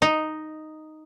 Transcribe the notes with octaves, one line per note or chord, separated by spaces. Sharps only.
D#4